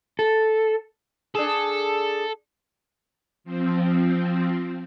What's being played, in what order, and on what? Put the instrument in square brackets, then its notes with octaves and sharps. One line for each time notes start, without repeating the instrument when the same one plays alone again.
[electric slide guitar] A4
[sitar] D4 G#4 [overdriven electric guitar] A4
[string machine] F3 C4